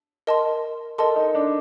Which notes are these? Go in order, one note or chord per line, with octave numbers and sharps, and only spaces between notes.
A#4 D#5 A5 C6
A4 A#4 D#5 A5 C6
D#4
D4